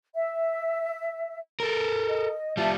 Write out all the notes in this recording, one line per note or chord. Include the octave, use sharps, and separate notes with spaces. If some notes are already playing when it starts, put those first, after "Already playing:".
E5
A4 A#4
D#5
G3 F4 E5 A5